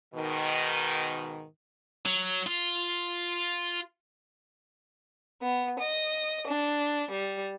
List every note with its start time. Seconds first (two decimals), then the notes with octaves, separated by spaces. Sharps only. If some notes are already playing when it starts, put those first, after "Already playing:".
0.14 G#2 B2 D#3
2.06 F#3
2.46 F4
5.42 B3
5.78 D#5
6.46 D4
7.11 G3